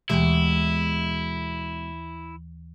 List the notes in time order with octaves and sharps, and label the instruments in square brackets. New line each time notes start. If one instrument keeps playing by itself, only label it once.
[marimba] D#2 E3 [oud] B2 G#3 G4 [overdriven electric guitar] E4